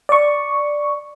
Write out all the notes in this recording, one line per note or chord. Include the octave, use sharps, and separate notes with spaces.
D5 C#6